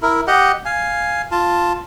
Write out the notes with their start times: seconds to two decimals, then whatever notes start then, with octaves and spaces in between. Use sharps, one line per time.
0.02 E4 A#4
0.27 G4 D#5 F#5
0.65 F5 G#5
1.31 F4 A5